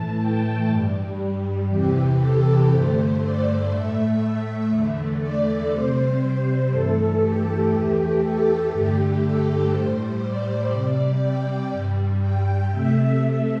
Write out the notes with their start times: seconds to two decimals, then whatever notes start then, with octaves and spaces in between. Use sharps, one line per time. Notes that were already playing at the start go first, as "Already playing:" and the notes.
Already playing: A2 E3 A3 A5
0.18 G5
0.68 G2 G3
1.68 E2 C3 E3 G4
2.19 A4
2.68 G2 D3 A3 C5
3.18 D5
3.69 A2 A3 E5
4.69 E2 D3 A3
5.19 D5
5.69 C3 G3 C5
6.69 G2 E3 A3 A4
7.20 G4
7.70 E2 E3 A3 G4
8.20 A4
8.70 G2 D3 A3 G4
9.20 A4
9.70 A2 G3 C5
10.21 D5
10.70 C3 G3
11.20 G5
11.72 G2 G3
12.21 G5
12.71 C3 A3 E5
13.21 E5